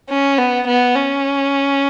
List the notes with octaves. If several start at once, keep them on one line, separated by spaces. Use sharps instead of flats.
C#4
B3
B3
C#4